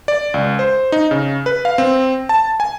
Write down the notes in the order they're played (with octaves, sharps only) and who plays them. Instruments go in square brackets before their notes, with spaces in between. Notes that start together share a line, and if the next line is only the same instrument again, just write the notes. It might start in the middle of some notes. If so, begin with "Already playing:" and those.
[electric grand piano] D5
C#2
C5
D#4
C#3
B4
F5
C4
A5
G#5